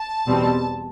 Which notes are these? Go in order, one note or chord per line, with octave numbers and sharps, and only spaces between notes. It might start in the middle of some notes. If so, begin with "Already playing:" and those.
Already playing: A5
E2 B2 G3 C4